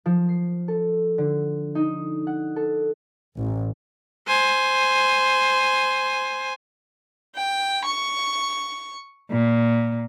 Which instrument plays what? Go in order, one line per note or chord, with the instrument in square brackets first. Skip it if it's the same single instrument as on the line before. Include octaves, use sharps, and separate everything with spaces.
[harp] F3
C7
A4
D3
D#4
F#5
A4
[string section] A1
[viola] C5 G#5
[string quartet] G5
C#6
A#2